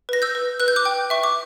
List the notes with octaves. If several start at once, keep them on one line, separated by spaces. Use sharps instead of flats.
B4 A#6
E6 G6
B4
B4 F#6
G6
D6 F#6
G5
E5 C#6
D6